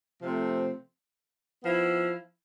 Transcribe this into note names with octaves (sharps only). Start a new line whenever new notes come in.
C3 F3 A3 C4
F3 B3 E4